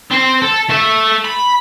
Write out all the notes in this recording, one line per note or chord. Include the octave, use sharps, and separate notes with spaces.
C4 C5
A4
A3 E5
B5